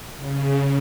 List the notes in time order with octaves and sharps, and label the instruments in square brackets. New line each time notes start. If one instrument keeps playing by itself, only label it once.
[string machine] C#3